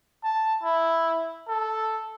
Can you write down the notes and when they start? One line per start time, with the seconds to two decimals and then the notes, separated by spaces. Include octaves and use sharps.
0.24 A5
0.64 E4
1.48 A4